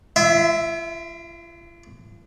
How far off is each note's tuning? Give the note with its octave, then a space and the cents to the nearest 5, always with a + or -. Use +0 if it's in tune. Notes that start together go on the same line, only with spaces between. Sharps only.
F4 -45 E5 +0